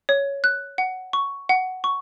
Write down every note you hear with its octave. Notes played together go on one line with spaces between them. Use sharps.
C#5
F#6
F#5
C#6
F#5
C#6